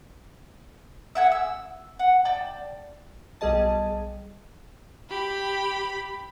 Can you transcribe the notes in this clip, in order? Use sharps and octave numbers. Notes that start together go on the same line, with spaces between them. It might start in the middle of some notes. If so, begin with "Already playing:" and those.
E5 F#5 G#5
E6
F#5
D5 G5 A5
B1 G3 G#4 D#5 A5
G4 B5